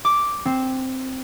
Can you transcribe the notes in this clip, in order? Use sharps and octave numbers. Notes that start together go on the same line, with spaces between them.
D6
C4